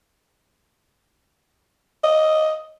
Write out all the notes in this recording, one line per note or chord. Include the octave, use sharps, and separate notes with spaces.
D#5